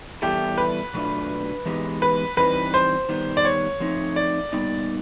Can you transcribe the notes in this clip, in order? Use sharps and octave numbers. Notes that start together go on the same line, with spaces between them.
E3 G3 B3 E4 G4 A4
B4
B2 F#3 A3 D4 F4
E3 G#3 B3 D#4 G4
B4
E3 G3 C4 D#4 B4
C5
D#3 G3 B3
D5
C#5
F3 A3 C4 D#4
D5
A#2 G3 B3 D#4